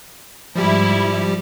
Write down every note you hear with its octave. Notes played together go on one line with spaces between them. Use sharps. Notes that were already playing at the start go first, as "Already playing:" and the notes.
G#2 F3 G3 E4 G4